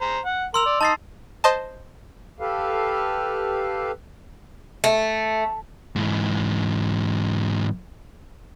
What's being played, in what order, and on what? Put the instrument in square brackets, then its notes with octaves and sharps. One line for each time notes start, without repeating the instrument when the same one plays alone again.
[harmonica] C5 A#5
F#5
[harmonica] A#4 [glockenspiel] C6 E6 F7
[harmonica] D5
[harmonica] D#4 D#5 [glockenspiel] A5 A6 C7
[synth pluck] C5 D#5 A5
[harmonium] G4 A4 B4 F5
[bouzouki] A3
[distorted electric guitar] G#2 E3